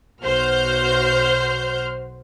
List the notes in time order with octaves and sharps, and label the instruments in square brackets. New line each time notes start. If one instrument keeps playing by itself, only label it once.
[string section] B1 F#4 C5 F6 G6